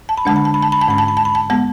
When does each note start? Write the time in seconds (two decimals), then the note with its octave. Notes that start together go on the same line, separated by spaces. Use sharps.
0.09 A5
0.17 B5
0.25 D3 G#3 D4 A5
0.36 B5
0.45 A5
0.54 B5
0.62 A5
0.72 B5
0.81 A5
0.88 G#2 G#3 C#4 B5
0.98 A5
1.08 B5
1.17 A5
1.25 B5
1.35 A5
1.50 G#3 B3 A5